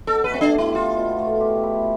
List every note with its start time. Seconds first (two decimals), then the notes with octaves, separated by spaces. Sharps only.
0.07 B2 A4
0.24 B4
0.30 A3 C4
0.41 D4
0.52 G4
0.58 E4
0.75 E4 F4
0.96 B2
1.19 A3
1.41 G4
1.63 E4